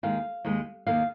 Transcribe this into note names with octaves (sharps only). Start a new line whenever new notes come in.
D#2 D#3 G#3 F5
D#2 D#3 G#3
D#2 D#3 A#3 F5